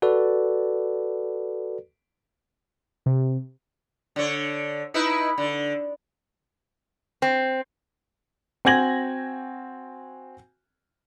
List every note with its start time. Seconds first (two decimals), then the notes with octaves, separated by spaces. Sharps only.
0.02 F#4 A4 B4 D5
3.06 C3
4.16 D3 C#5
4.94 D#4 E4 B4
5.38 D3
7.22 C4
8.65 C4 F#4 G#5 G#6 A#6 F#7